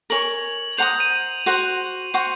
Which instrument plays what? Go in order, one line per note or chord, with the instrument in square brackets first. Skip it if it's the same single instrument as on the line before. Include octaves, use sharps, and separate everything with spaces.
[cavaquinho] A#4 C#5 G#5 C#6 [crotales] F#7
[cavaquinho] C5 F#5 A#5 D#6 [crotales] F7
[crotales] D#7
[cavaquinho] F#4 C5 F#5
F#4 C5 F#5 C#6